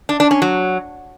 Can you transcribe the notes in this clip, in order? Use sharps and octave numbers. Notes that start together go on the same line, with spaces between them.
D4
D4
C#4
F#3